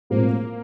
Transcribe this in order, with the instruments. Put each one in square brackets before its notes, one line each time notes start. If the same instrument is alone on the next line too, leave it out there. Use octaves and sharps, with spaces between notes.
[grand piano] A2 F3 G#3 C4 [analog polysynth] A#3